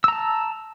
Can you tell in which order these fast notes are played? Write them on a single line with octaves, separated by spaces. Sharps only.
E6 A#5 A5